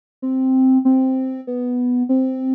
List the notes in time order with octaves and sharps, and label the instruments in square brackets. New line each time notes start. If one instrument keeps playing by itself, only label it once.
[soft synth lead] C4
C4
B3
C4